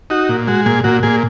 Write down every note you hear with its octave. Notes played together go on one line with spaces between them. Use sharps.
D#4 F#4
A#2
G#3 F#4
A#2 G#4
A#2 F#4
A#2 G#4